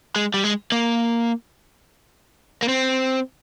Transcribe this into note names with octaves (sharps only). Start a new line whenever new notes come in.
G#3
G3
G#3
A#3
A#3
C4